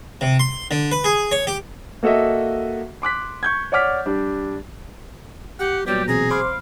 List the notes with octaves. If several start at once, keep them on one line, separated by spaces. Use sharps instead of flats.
C3
C6
D3
B4
G#4
C#5
G4
A#3 F#4 A4 D#5 E5
C6 D6 F#6 B6
C#6 G6 G#6
C#5 D5 F#5 D6 F6 B6
G3 D4
G4 F#5
A#2 F#3 G3 B3 G4
B2 E3 C4 G#4 A#5
C5 F5 B5 C6 D6